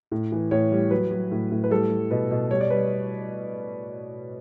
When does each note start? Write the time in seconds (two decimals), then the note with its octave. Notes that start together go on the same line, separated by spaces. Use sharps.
0.12 A2
0.32 E3
0.51 A2 C#5
0.72 G3
0.91 F#3 B4
1.11 F#3
1.31 A2
1.51 A2
1.64 B4
1.70 G3 A4
1.90 G3
2.11 B2 B4
2.31 B2
2.51 G3 C#5
2.61 D5
2.70 G3 B4